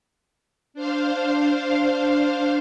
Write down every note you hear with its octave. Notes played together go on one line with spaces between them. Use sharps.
D4 C5 F5